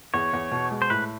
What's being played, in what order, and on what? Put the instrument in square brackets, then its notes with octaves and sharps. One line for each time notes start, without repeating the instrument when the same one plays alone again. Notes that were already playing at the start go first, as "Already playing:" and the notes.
[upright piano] E2 [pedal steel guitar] C#5
[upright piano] E2
B2
G#3
[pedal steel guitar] C5
[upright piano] A2 [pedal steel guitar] B4